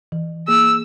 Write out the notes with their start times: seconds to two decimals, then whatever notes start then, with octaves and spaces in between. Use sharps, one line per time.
0.12 E3
0.48 A#3 G#4 E6